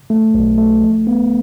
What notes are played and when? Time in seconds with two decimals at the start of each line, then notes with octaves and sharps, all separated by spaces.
0.10 A3
0.34 B1
0.58 A3
0.82 F3
1.07 B3